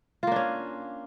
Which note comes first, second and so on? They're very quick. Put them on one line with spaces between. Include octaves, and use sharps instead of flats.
F4 A#3 D4 C#4